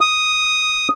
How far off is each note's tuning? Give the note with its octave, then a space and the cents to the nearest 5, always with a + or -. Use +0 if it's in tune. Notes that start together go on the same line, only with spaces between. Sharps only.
D#6 +0